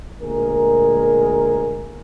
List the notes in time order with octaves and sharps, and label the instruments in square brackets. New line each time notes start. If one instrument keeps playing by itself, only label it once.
[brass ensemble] D2 A#2 G#3 G#4 A#4